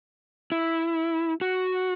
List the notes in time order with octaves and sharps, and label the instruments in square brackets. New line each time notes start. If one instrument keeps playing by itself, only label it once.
[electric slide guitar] E4
F#4